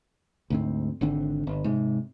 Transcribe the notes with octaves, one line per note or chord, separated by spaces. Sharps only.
D2 G#2 C4
G#1 D3 C4
G1
G#2 C3